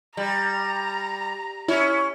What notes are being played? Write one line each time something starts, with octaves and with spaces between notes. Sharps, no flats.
G3 A#5
C#4 E4